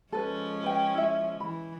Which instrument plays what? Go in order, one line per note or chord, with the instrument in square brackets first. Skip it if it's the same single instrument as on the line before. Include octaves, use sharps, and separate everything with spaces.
[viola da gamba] F3 G#3 C#4 [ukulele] A4 B4
[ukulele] B4 G5
E4 E5
[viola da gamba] E3 [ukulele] B5